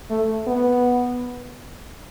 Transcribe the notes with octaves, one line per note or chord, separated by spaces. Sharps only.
A3
B3